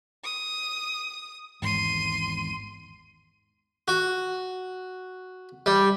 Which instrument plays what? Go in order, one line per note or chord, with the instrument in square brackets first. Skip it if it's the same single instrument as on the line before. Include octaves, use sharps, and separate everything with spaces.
[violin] D#6
[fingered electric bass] G#1 E2 G#2 [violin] C6 D#7
[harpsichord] F#4
G3